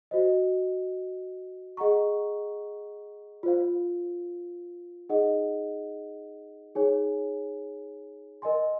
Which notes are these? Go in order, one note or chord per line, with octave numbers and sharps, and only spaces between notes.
F#4 C5 D#5
G#4 D#5 F#5 A#5 C#6
F4 C5 F5
D#4 G#4 D#5 F#5
D#4 G#4 C#5 G#5
A#4 D#5 G#5 C6